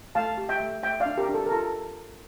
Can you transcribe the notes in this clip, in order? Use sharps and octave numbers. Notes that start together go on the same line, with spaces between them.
A3 F5 A5
G4
E5 G5
A3
A3 E5 G5
D5 F5
D4
G4 A#4
D4
A4
A#4
F4 A4